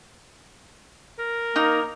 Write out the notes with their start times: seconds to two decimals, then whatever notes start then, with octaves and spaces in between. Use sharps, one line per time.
1.19 A#4
1.56 A#3 D#4